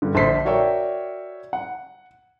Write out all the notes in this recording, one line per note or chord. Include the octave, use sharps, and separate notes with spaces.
G2 D3
A#1 C5 A5 C6 B6 C7
F#4 A#4 C#5 D5 E5 G5
F#5